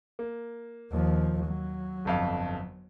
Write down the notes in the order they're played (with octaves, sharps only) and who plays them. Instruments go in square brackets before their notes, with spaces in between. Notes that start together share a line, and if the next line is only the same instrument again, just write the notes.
[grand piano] A#3
[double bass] D#2 F3
F#3
[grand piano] G1 F2 F5